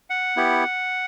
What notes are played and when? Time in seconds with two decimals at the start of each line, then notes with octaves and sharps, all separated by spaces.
0.10 F#5
0.36 B3 E4 G4